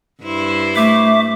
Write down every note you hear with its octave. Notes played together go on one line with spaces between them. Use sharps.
G2 E4 C5
A3 E5 D6